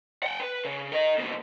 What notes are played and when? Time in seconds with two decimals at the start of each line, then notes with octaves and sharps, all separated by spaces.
0.23 F#5 G5
0.40 B4
0.65 C#3
0.92 A#4 D#5
1.18 D#2 B2